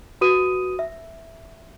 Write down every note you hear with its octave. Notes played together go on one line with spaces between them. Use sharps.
F#4 B4 D#6 D#7
E5